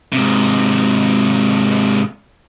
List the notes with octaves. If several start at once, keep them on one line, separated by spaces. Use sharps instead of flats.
G#2 C3